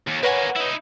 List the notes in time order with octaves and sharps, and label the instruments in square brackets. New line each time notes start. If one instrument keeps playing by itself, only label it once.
[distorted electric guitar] D#2
[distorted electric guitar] A#3 G#5 [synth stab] B4 C#5 F#5
[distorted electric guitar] D#4 E4